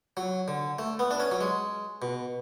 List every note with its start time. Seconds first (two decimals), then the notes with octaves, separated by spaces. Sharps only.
0.17 F#3
0.48 D3
0.79 A3
0.99 B3
1.11 D4
1.20 C#4
1.31 F#3
1.41 G#3
2.02 B2